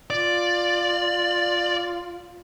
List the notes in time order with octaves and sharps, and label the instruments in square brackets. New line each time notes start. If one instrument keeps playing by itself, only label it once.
[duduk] F4 [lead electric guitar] D5